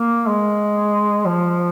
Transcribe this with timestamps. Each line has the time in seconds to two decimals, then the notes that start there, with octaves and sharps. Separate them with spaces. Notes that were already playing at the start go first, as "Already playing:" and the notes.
Already playing: A#3
0.27 G#3
1.25 F3